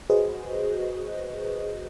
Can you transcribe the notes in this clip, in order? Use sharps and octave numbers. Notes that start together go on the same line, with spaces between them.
F#4 G#4 B4 C5 D#5